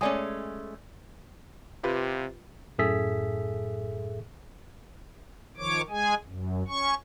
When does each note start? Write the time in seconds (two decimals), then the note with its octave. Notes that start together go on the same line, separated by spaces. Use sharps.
0.01 G#3 A3 C#4 D5 G#5 D#6
1.84 C3 F4 G4 B4
2.78 F#2 A2 G#4 A4 E5 B6
5.57 D#3 F3 C#5 D6
5.90 G#3 G#4 G#5
6.26 F#2
6.68 C#4 C#6